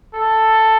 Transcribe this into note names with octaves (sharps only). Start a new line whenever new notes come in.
A4